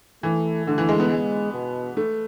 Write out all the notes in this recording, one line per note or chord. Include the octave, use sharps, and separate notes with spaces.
E3 A3
D3 A3
E3
G#3
B3
G#3
B2
A3